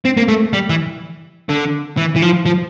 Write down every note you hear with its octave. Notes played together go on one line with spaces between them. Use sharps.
C4
A#3
A3
G3
E3
D3
E3
E3
F3
F3